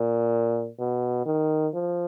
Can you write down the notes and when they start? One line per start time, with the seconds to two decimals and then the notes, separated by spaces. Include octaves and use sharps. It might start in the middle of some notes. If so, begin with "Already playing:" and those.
Already playing: A#2
0.79 B2
1.25 D#3
1.73 F3